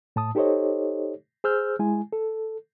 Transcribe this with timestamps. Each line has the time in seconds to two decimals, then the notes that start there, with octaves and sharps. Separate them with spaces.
0.16 A2 A5 D#6
0.35 D#4 G4 A4 C5 C#5 D#5
1.44 G#4 C5 E6 F6 G6
1.79 G#3 E4 G#5
2.13 A4